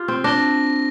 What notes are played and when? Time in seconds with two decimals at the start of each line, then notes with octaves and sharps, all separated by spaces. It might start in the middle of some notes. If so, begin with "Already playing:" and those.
Already playing: F4 G4
0.08 C4
0.24 D4 A#6 G7